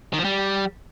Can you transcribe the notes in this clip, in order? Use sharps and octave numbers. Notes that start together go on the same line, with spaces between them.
D#3
F3
G3